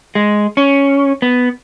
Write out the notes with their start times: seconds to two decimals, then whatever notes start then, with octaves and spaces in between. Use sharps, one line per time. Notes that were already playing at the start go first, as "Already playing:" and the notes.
0.15 G#3
0.57 C#4
1.22 B3